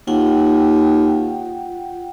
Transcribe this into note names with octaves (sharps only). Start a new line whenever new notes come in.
D#2 F4 F#5 G5